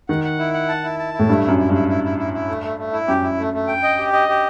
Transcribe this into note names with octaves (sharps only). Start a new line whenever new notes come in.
D#3 F#5
F#5
E4
F#5
A5
E4
A5
E4
A2
G2 A3
F#2 E4
E4
G2 E4
E4
E4
E4
E4
A3
A3
A3
E4
F#2 G4
E4
A3
A3
G5
D#5
G4
D#5
G4